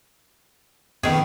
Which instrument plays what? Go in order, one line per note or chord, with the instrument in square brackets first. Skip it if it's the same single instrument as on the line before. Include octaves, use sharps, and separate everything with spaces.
[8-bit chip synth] F2 B3 [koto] D#3 G#4